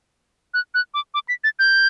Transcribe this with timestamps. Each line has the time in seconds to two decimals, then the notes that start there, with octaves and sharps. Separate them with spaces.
0.54 F#6
0.74 F#6
0.94 D6
1.14 D6
1.28 B6
1.44 A6
1.59 G6